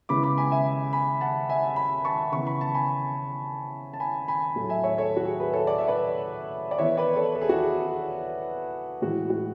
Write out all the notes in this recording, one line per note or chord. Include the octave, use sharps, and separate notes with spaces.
C#3 G#3 B3 E4 B5 D6
B5 D6
G#5 B5
E5 G#5
G#5 B5
F#5 A5
E5 G#5
G#5 B5
A5 C#6
C#3 E3 B3 E4 C#6
B5
A5
G#5 B5
A5
G#5 B5
G#5 B5
A2 F#3 A3
E5 G#5
C#5 E5
A4 C#5
F#4
G#4
G#4 B4
A4 C#5
D5
E5
B4 D5
D5
E3 B3 E4 C#5 E5
B4 D5
A4 C#5
A4
G#4
F#4 A4
G#4
A2 E3 G#3 F#4
F#4